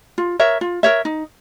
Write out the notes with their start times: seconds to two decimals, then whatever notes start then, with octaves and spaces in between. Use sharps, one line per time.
0.18 F4
0.39 A#4 C#5 E5
0.61 F4
0.83 A#4 C#5 E5
1.05 D#4